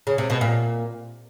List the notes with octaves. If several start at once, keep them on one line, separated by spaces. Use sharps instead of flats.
C#3
C3
B2
A#2